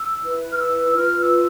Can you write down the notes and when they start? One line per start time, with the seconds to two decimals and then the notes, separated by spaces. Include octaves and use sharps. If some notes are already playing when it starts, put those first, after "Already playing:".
Already playing: E6
0.23 E4 B4
0.52 F6
0.59 E6
0.95 F4 B4 F6
1.19 E6